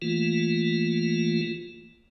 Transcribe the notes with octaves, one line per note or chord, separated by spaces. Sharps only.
E3 A3 A#3 F4